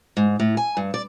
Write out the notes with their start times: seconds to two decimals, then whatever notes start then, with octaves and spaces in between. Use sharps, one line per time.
0.17 G#2
0.39 A2
0.57 G#5
0.77 G2
0.94 D5